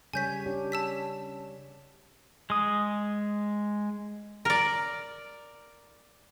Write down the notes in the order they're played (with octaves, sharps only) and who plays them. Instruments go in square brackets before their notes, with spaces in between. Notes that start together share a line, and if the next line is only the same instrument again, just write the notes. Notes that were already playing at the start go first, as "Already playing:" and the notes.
[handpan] C#3 G3 C#5 [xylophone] G#5 G6 B6
[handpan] C#4 D4 G4
[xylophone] A5 E6 B6
[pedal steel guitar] G#3 D#6
[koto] A#4 D5